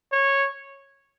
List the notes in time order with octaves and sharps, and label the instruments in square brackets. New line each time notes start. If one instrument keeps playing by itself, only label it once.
[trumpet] C#5